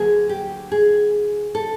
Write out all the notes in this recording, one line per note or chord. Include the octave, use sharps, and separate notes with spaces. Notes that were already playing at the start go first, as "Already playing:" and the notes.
Already playing: D2 D3 F#3 A#3 G#4
G4
G#4
A4